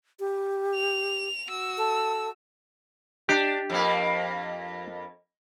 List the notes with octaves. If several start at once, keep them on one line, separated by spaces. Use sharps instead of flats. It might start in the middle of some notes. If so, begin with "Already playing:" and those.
G4
F7
F#4 E6
A4
D4 G4
F2 A#3